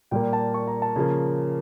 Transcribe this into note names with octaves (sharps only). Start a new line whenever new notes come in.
A#2 G3 A#3 G5
A5
C#6
A#5
A5
C#3 F3 A#3